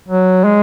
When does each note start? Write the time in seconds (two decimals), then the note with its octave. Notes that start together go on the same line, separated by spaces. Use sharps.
0.08 F#3
0.44 G#3